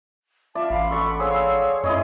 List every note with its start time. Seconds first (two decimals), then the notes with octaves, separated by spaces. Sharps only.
0.55 F4 D5 E5 A5
0.70 A1 F5 B5 C6
0.91 A4 D5 F#5 C#6
1.19 G#4 C5 C#5 F5 E6
1.84 F#2 E4 G#4 C#5 D#5 C6